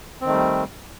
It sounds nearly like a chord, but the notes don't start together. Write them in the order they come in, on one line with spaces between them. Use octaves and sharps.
C4 D#3 A3 G3